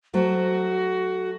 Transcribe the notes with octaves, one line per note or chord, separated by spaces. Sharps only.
F#3 A3 F#4 C5